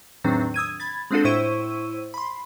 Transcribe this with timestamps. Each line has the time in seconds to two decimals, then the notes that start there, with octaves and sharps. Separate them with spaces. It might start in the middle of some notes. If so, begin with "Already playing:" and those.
0.24 E2 A2 D#3 F#3 C4 D4
0.54 D#6 E6 G#6 D#7
0.80 B5 G#6 A6
1.11 G#3 C4 D4 F4 F#4 A4
1.24 A2 E4 C5 C#6 E6 D#7
2.14 B5 C6